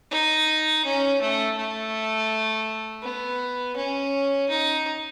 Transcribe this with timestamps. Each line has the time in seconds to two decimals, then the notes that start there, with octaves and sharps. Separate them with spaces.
0.11 D#4
0.85 C#4
1.21 A3
1.57 A3
3.03 B3
3.77 C#4
4.50 D#4